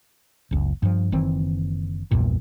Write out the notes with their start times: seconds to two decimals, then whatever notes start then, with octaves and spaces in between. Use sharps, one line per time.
0.51 F#1 C#2
0.82 G2 F3
1.12 F#1 D#3 E3 C4
2.11 A#1 E2 G2 A#2